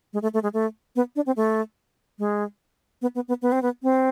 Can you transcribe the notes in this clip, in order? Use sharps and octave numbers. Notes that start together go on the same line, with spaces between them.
G#3
A3
A3
G#3
A3
B3
D4
C4
A3
G#3
B3
B3
B3
B3
C4
B3
C4